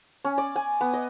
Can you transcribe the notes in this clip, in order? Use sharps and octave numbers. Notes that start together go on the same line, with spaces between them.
C#4
D5
G#5
B3
D#5